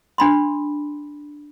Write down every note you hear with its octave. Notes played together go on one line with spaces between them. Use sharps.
D4 B5 C6